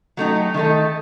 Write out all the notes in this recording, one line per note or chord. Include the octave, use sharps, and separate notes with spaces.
F#3 A3 D#4 G4
D#3 A3 D#4 A4